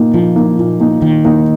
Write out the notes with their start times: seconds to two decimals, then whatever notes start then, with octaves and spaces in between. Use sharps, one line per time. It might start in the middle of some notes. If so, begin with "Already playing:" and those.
Already playing: A#2 A#3 D#4
0.14 A#2 F3
0.36 A#3 D#4
0.58 A#2
0.80 A#3 D#4
1.01 A#2 D#3
1.24 A#3 D#4